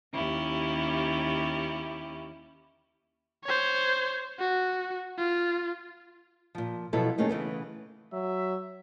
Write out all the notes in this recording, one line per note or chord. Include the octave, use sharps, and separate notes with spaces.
D#2 C#4 E4 G4
C5 C#5
F#4
F4
A#2 F3
B2 F3 F#3 E4 A4
D#3 A3 A#3 C#4 D#4 G#4
C#3 E3 A3 B3
F#3 E5